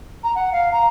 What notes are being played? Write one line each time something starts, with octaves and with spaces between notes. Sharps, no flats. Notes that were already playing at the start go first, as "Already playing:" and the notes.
A#5
F#5
F5
A#5